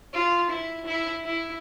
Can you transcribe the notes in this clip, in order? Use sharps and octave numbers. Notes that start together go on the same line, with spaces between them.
F4
E4
E4
E4